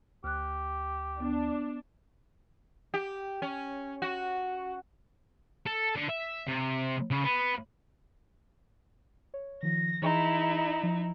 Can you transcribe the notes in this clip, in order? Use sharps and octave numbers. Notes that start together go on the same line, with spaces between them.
D2 G4 F6 F#6
B3 D4
G4
C#4
F#4
A4
D3
E5
C3
C#3
B3
C#5
D#3 F3 A#6
E3 D#4 E4 G#4 C6
F3